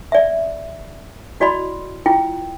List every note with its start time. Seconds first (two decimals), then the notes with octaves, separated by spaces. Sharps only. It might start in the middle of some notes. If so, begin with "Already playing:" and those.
0.12 D5 E5
1.40 E4 F#4 D5 D#5 B5 C6
2.06 E4 F4 G5